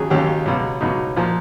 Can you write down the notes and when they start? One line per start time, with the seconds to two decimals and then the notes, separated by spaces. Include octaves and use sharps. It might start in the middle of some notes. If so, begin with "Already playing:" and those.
Already playing: D#2 C#3 F#3 G#4
0.10 D#2 C#3 F#3 G4
0.46 C#2 B2 F#3
0.80 C#2 B2 F#3 D#4
1.16 A#2 F3